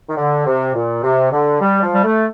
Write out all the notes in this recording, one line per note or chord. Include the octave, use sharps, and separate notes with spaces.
D#3
D3
C3
A#2
C3
D3
G3
F3
G3
A3